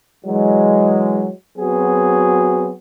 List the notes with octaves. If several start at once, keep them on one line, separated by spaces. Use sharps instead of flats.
E3 F#3 G#3
F#3 B3 C4 F#4 G#4